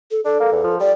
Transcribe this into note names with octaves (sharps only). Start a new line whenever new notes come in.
A4
D4 A4
A#3
E2
F3
G3 D5